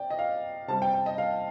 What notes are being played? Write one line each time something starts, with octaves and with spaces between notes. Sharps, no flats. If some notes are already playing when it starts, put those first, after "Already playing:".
Already playing: C3 D5 G5
D#5
F5
C3 G3 C4 A5
G5
G5
D#5
F5